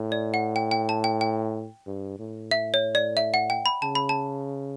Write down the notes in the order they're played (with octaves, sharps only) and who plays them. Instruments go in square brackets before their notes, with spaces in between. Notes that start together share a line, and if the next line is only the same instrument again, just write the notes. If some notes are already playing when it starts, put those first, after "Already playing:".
Already playing: [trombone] A2
[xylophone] D5
F#5
G5
G5
A5
G5
G5
[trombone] G2
A2
[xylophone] E5
C#5
D5
E5
F#5
G5
B5
[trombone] C#3 [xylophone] A5
[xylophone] B5
A5